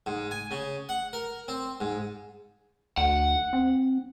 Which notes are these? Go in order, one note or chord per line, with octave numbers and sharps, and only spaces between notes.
G#2
G#5
C#3
F#5
A#4
C4
G#2
D2 F#5
C4